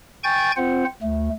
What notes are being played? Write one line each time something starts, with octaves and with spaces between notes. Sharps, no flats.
G5 G#5 C#6 G6 A6
C4 F4 C5 F#5
D2 A3